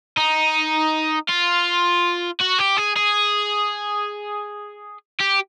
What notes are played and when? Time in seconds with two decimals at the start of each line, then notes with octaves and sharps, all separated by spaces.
0.17 D#4
1.29 F4
2.41 F#4
2.59 G4
2.78 G#4
2.96 G#4
5.20 G4